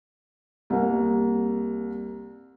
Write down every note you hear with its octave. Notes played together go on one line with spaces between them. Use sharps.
C2 A#3